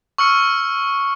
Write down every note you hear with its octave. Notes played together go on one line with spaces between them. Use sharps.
C#6 E6 F6 C#7